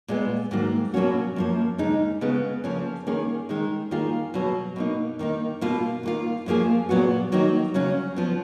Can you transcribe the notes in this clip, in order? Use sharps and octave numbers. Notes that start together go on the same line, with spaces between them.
A#2 G#3 B3
G#2 D#3 F#3 A#3
B2 F#3 A#3 C#4 F#4
F#2 F3 A#3
D#2 C#3 G#3 D#4
C#3 G#3 B3
C#3 F3 A#3 C#4
D#3 A#3 C#4 G#4
D#3 G#3 D#4
D#3 A#3 F4 G#4
B2 F#3 B3
B2 A#3 D#4
D#3 A#3 D#4
B2 A#3 F4
D#3 A#3 F4
F#2 F3 A#3 F4 G#4
A#2 F#3 B3 F#4
D#3 F#3 A#3 D#4
C#3 F#3 C#4 F#4
F3 B3